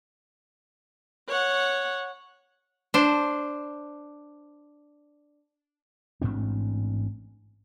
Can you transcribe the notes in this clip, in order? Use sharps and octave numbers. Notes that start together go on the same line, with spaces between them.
C#5 F#5
D4 C5
A1 G#2 C4 D4